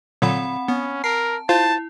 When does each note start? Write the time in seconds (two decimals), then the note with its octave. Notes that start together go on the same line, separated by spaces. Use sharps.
0.22 A#2 D3 F#3 C4 F#5 B5
0.68 B3 C#4
1.04 A#4 A5 C7
1.49 E4 F4 C5 F5 A5